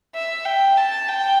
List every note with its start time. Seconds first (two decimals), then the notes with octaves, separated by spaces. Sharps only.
0.15 E5
0.46 G5
0.78 A5
1.08 G5